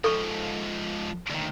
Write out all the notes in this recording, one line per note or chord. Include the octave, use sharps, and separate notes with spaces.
G#2 F3 A4 C#6
D2 D#3